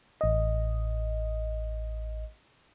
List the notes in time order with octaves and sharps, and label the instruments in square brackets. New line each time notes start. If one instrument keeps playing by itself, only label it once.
[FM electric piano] A1 D#5